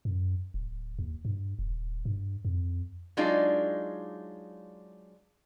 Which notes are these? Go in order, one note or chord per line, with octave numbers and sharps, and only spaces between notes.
F#2
D1
D#2
G2
D#1
G2
F2
F#3 G#3 D4 D#4 F4